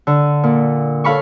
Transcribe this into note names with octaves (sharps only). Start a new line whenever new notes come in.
D3
A#2
A4 C#5 F5 B5 C#6